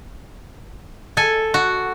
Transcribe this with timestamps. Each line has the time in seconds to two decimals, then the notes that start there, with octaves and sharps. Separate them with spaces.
1.17 A4 G#5
1.54 F#4